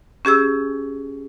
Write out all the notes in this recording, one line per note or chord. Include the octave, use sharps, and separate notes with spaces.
C#4 G4 G#4 E6